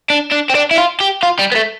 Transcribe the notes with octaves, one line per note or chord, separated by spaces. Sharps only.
D4
D4
C4
D4
E4
F4
G4
F4
G3
B3
A3